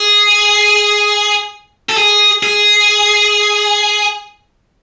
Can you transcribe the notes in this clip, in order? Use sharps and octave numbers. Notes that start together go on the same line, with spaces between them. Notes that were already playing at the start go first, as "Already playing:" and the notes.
Already playing: G#4
A4
G#4
G#4